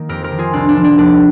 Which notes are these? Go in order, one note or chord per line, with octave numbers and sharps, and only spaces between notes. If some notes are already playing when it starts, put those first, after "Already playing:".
Already playing: D#3 A#3
F2 G4 A#4
G4 A#4
D#3
F4 G#4
C2 D4 F4
D4
F3
D4
D#2 D4